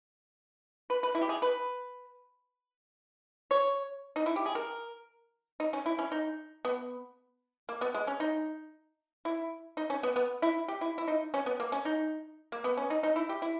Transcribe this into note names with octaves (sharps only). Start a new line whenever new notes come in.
B4
B4
E4
G4
G#4
B4
C#5
D#4
E4
G4
G#4
A#4
D#4
C#4
E4
C#4
D#4
B3
A#3
B3
G#3
C#4
D#4
E4
D#4
C#4
B3
B3
E4
G4
E4
E4
D#4
C#4
B3
A#3
C#4
D#4
A#3
B3
C#4
D#4
D#4
E4
G4
E4